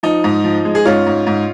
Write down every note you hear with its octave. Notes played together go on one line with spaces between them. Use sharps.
F3 D#4
G#2
F3
G#3
G#4
G#2 C#4 F4
G#2
G#2